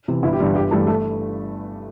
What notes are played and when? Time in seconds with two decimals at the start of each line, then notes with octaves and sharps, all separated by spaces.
0.08 C3 E3
0.23 G1 E4
0.33 G4
0.39 G2 D3 E3 G3 E4
0.55 G1 G3 G4
0.71 G2 E3 G3 A3 A4
0.87 A3 A4